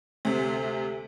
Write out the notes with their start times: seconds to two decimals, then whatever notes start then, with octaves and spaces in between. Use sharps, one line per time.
0.25 D2 C3